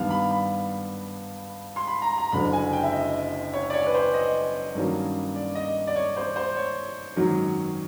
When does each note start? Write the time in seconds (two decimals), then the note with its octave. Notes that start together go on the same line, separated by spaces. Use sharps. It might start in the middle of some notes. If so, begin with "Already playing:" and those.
Already playing: G2 D#3 G3 B3 F5
0.10 B5
0.31 B5
1.76 C6
1.87 B5
2.02 A#5
2.18 A#5
2.32 F#1 F#2 D3 B5
2.53 G#5
2.73 G5
2.83 E5
2.93 D#5
3.53 C#5
3.70 D5
3.73 C#5
3.86 B4
3.94 C5
4.14 D#5
4.75 G2 D#3 F#3 A#3 C#4
5.36 D5
5.55 D#5
5.87 D5
5.96 C#5
6.17 C5
6.36 C5
6.57 C#5
7.16 G#1 F#2 D#3 F#3